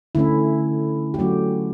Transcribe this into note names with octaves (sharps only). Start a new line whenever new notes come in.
D3 A3 C#4 E4
G4
F#3 A3 C#4 F#4